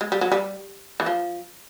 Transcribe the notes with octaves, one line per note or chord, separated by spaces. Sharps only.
G#3
G3
F#3
G3
E3
F3